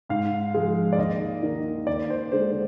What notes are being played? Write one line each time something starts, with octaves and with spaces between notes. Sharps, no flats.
G#2 F5
F3 G#3
D5
D#2 D#5
D#3 A#3
D#2 D5
C5
D3 G#3 C5